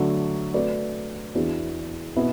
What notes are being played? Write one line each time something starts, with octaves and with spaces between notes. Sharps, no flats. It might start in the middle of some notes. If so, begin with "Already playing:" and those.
Already playing: D3 F#3 A3 D4
A3 F#4 B4 D5
E2 E3 D4 F#4
B2 B3 E4